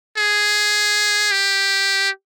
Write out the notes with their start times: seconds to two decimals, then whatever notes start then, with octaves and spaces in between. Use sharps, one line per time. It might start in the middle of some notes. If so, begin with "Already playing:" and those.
0.18 G#4
1.32 G4